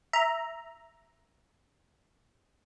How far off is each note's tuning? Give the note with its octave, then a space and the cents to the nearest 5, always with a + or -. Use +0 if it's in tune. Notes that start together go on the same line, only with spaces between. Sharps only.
E5 +0 A#5 +0